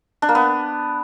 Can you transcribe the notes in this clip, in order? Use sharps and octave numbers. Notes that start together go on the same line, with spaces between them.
D4
A#3
B3